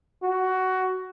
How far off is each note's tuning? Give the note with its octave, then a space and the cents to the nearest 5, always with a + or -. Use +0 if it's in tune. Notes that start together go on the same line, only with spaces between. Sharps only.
F#4 +15